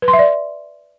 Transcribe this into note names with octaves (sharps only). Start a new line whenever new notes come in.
B4
C6
E5
D5